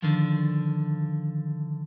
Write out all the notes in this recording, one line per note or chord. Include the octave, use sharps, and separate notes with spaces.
D3 D#3 F3